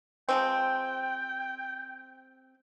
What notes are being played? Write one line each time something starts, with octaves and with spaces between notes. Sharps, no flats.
F3 G#3 C4 G5